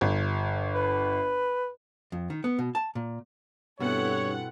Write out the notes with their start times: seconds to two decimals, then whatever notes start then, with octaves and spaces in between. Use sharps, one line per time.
0.01 G1
0.75 B4
2.12 F2
2.30 D#3
2.44 B3
2.59 B2
2.75 A5
2.95 A#2
3.80 G2 B2 C4 E4 A4 C#5 F#5